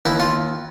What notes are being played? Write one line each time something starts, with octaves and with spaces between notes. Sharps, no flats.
D#2 E4
F4